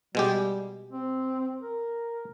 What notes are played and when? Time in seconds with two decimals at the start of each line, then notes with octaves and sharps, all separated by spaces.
0.15 B2 G3 G#3 G4
0.92 C4
1.61 A#4